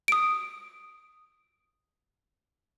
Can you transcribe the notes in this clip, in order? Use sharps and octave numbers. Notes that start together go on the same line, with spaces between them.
D#6 D7